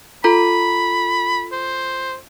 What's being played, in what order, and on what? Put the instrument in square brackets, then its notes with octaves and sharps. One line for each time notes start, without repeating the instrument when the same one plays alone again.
[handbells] F4 A4 A#5 [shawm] B5
[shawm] C5